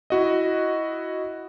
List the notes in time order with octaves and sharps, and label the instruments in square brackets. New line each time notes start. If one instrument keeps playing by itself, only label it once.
[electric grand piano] E4 F#4 D#5